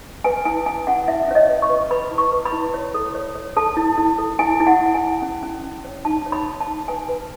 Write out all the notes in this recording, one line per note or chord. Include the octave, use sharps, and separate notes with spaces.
B4 G#5
E4 G#5
C#4 G#5
C#4 F#5
E4 E5
C#4 C#5
D#5
B4
C#6
B4
B4 B5
E4
C#6
B4
B5
E4
C#5
A4
C#5
C#5
A4 A5
E4
E4
A4
E4 G#5
E4
F#5
E4
G#5
E4
C#4
C#4
C#4
C#5
D#4 A5
C#5
B5
C#5
A5
D#4
B4 G#5
B4